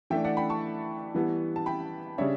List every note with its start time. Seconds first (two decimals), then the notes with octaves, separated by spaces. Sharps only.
0.10 E3 A3 D4 E5 G5
0.24 D5 F#5
0.37 G5 B5
0.50 A5 C#6
1.15 E3 G3 B3 E4
1.56 A5
1.66 G5 B5
2.18 C#3 G3 D4 C#5 E5